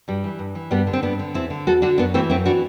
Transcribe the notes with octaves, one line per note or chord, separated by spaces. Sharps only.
G2 G3
E3
G2
E3
G2 G3 B3
D3
C4
G2 B3 D4
D3
E2 C4 E4
D3
E2 F#4 A4
D3 D4 F#4
F#2 B3 D4
E3 A3 C4
F#2 C4 E4
E3 D4 F#4